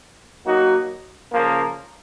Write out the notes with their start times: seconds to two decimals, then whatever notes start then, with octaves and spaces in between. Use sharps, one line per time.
0.45 F#3 A#3 D#4 F#4
1.31 C#3 F3 A#3